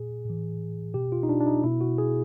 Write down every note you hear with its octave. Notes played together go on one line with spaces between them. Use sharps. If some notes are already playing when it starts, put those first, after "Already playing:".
Already playing: A#2 G#4
A2 E3
B2 G4
F4
D#4
D4
D4
D#4
B2 E4
F#4
G#4